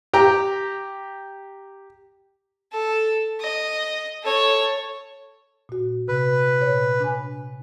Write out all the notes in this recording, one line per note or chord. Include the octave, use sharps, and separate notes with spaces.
G4 G5 A#5
A4
D#5
A4 C#5
A#2 F#4
C3 B4
A#2 C#5
D4 G#5